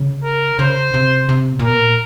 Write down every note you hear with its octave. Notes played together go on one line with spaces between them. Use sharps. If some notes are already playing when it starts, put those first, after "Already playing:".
Already playing: C#3
A#4
C#3 C5
C3
C3
B2
A#2
B2 A#4
A#2